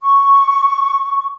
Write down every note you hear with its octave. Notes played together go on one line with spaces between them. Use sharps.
C#6